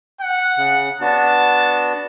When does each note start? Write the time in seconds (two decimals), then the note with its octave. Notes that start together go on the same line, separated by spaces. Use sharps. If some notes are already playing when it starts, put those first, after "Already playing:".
0.21 F#5
0.58 C#3
1.01 B3 D4 F#4 A5